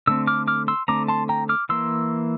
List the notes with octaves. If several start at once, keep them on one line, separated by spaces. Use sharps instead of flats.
D3 A3 C4 E6
D6 F6
D6 F6
C6 E6
D3 A3 C4 A#5 D6
A5 C6
G5 A#5
D6 F6
E3 A#3 C6 E6